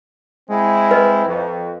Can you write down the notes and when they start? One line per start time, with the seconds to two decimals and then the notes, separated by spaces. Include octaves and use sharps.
0.49 G#3 C4 E4
0.91 B4 D#5
1.26 F2